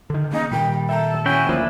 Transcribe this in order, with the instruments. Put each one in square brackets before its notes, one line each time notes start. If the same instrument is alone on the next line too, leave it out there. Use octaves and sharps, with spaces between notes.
[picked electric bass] D3 D#3
[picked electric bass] C#3 A#3 C#4 [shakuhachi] D#4
[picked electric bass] A#2 D#3 [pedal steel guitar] G3 [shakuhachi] G5
[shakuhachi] A4 [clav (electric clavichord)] E5 G5 A#5
[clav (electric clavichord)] C#4 [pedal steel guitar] E4 F#4 G5 [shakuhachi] G#5
[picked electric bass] D2 A#3 [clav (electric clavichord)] F3 [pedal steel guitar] D4 E4